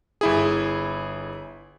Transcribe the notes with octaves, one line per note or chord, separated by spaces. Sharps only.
G1 E4 G#4